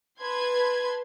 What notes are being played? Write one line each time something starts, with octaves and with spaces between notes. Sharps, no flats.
B4 A5 C6 G#6